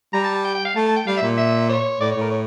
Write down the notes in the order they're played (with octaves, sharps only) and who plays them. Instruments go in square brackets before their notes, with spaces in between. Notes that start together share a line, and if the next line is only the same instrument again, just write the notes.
[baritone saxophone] G3 [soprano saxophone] A#5
[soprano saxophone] A5
A5
G5
G5
F5
[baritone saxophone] A3 [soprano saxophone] A5
[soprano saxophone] A5
G5
[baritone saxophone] G3 [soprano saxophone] F5
[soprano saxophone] E5
[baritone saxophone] A#2
[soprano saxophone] E5
C#5
[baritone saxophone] A2 [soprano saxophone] D5
[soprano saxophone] C#5
[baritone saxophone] A2 [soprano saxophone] A#4
[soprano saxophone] C#5